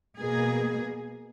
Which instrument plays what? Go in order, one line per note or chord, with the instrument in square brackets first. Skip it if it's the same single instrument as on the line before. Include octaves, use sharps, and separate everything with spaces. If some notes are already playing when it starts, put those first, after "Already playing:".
[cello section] B2 A#3 G#4